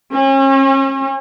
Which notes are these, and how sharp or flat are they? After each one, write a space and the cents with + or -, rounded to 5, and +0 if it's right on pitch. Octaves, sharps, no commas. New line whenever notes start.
C#4 -40